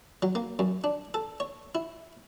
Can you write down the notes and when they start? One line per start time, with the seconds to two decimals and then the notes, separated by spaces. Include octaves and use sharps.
0.22 F#3
0.35 A#3
0.59 F#2
0.84 D4
1.14 A4
1.40 C#5
1.75 E4